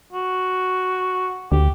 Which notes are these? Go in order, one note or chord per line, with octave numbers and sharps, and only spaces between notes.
F#4
D2 G4